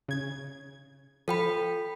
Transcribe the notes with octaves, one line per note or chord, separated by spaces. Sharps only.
C#3 G#6
F3 F4 A4 G5 B5